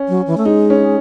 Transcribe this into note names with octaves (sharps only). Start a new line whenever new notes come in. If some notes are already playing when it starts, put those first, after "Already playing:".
Already playing: C#4
F#3
E3
A3
G#3 D#4
C#4